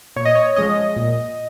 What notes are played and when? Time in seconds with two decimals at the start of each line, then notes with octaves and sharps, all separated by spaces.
0.16 A#2 C#5
0.25 D#5
0.35 C#5
0.56 F3 G#3 C#4 D#5
0.96 A#2